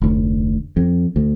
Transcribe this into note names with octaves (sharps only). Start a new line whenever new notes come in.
F1 D2
F2
D2